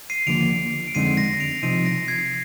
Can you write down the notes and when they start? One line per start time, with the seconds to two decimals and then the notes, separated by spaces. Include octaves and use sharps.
0.10 C7 D#7
0.26 D#2 D3 F3 A#3 D7 F7
0.87 D7
0.95 F2 D3 G#3 C4 D#4 C7 D#7
1.17 A#6 D7
1.40 D7 F7
1.62 C2 C3 F3 C4 D#4 C7 D#7
1.86 A#6 D7
2.08 G#6 C7